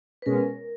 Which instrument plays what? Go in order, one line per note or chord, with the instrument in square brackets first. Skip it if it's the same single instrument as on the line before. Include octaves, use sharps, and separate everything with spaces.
[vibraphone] B4
[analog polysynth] B2 G#3 C#4 [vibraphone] A#4